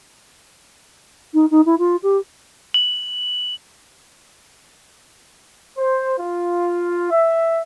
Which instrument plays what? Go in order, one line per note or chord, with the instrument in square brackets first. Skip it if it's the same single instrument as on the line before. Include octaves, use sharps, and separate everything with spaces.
[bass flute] D#4
D#4
E4
F4
G4
[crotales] F#7
[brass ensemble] C5
F4
E5